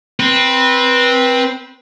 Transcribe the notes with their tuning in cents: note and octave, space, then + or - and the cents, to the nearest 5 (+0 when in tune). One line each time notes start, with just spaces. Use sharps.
C4 +0 B4 -20